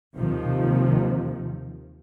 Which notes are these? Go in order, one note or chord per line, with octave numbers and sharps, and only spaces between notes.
D#2 C3 D#3 F3